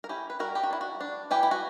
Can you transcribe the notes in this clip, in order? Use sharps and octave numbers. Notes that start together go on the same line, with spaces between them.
A#4
C#4 E4 G4
B4
G3 F#4 A#4
G4
F#4
D4 E4
F#4
D4
E3 E4 G4
E4
F#4